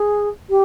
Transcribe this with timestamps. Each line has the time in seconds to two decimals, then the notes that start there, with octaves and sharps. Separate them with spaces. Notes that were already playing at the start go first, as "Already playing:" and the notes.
Already playing: G#4
0.50 G4